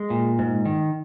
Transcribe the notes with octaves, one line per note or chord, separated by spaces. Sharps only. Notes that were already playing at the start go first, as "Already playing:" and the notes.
Already playing: G#3
A#2
G#2
D#3